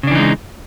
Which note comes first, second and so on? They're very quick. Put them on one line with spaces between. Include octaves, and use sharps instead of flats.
C#3 D4 E3 D#4 G#3